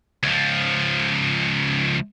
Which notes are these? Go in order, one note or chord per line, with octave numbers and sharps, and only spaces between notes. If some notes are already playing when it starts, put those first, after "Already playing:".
C#2 F3